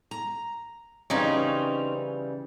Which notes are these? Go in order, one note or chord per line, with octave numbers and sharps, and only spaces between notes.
A#5
C#3 E3 G3 C4 C#4 D#4